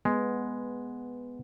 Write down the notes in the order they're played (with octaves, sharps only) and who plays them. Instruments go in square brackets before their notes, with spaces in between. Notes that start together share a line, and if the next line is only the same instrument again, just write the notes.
[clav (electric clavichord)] G#3 [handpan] B3